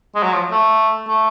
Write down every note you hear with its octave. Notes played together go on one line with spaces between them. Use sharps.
G#3
F#3
F3
A3
A3